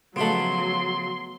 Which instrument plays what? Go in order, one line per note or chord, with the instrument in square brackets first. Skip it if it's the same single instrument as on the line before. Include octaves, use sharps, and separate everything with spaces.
[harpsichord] C#3 F3 B5 [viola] F#3 [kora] A3 B3 [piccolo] C6